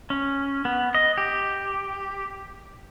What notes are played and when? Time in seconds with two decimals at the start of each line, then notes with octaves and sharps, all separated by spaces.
0.10 C#4
0.65 B3
0.95 D#5
1.18 G4